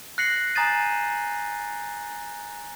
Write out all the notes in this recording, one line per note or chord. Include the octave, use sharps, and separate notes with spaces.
F#6 A#6 C7 C#7 F#7
G#5 A#5 D#6 G6 A6 D#7